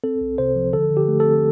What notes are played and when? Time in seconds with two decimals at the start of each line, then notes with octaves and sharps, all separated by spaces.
0.04 C4 A4
0.21 C2
0.38 C3 C5
0.56 F3
0.73 D3 A4
0.90 D3
0.97 G4
1.08 A3
1.20 A4
1.26 C4